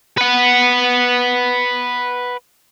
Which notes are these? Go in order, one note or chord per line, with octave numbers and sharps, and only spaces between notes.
B4 F#5